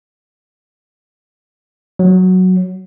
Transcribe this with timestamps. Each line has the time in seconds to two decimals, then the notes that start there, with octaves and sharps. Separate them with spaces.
1.99 F#3